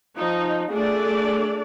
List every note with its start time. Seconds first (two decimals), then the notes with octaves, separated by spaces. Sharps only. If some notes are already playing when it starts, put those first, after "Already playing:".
0.19 F3 D#4
0.71 A3 D4 G#4 D5